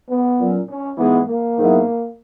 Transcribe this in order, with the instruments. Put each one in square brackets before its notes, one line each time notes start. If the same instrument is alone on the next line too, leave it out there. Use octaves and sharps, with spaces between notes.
[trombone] B3
[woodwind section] A#2 F#3 C#4
[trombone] C#4
[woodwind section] G#2 E3 G#3 D#4 G#4 [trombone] B3
[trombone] A#3
[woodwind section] G#2 D#3 F#3 B3 E4